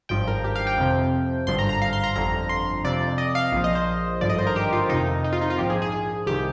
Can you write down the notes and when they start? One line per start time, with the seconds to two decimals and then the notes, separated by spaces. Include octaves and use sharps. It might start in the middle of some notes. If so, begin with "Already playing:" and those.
0.09 G#1 G2 F3 G5
0.27 A#4
0.44 G4
0.56 F5
0.67 G5
0.78 F2 C3 F3
1.47 G#1 G2 D3 F3 C6
1.59 A#5
1.69 A#5
1.82 F5
1.93 C6
2.04 A#5
2.16 G1 F2 D3 F3 A#5
2.49 C6
2.84 F2 C3 F3 D5
3.18 D#5
3.35 F5
3.52 A#1 A#2 F3 F5
3.64 D#5
3.75 C5
4.21 G#1 G2 D3 F3 D5
4.30 D#5
4.39 C5
4.47 A#4
4.56 G4
4.73 F4
4.90 F2 C3 D#3 D#4
5.24 D#4
5.33 F4
5.42 D#4
5.50 F4
5.58 A#1 G#2 F3 G4
5.70 G#4
5.82 G#4
5.92 G#4
6.27 C2 C3 D#3 G4